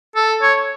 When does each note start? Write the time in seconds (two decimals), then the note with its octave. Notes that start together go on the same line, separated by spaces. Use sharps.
0.16 A4
0.42 C#5